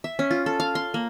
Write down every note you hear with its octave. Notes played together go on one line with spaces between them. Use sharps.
E5
C#4
F4
A4
F5
C6
A#3